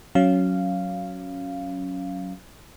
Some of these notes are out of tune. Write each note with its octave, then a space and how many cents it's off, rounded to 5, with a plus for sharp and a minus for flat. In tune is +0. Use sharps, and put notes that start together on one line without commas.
F#3 +0 C#4 +0 F5 -10